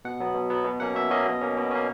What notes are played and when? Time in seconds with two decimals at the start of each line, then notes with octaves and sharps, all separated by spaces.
0.05 B2 F#5
0.20 F#3 B3
0.35 B2
0.50 F#3 B3
0.65 B2
0.80 F#3 A#3 C#4 F#5
0.95 B2 E5
1.11 F#3 A#3 C#4 D#5
1.26 B2
1.41 A#3 C#4
1.57 B2
1.71 A#3 C#4